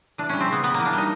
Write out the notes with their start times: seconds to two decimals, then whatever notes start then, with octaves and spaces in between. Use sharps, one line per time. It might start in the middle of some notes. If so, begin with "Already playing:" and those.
0.18 E3 D4
0.29 G3 C#4
0.41 C4
0.48 C#3 B3
0.64 C#3 B3
0.74 E3 A#3
0.86 D4
0.93 G3 D#4